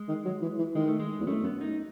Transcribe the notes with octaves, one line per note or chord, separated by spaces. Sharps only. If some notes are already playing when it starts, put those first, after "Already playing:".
Already playing: G#3
D#3
F#3
E3
E3
D#3 G#3
A3
G#3
E2
F#2 A3
F#2 B3
D#4